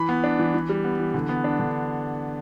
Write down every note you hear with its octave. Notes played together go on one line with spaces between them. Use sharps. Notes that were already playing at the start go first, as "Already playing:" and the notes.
Already playing: E3 B5
B3
D4
E3
E3
G3
B3
E3
D3
B3
D4
D3